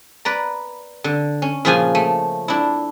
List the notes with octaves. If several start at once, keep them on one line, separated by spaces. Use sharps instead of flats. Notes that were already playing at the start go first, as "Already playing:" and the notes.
B4 D5 A#5
D3
C#4
A#2 C#3 F3 F4 G#4 G#5
A3
D4 E4